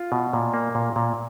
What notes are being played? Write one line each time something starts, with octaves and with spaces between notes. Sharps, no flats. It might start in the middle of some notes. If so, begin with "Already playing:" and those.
Already playing: F4
B2
A#2
A#3
A#2
A#2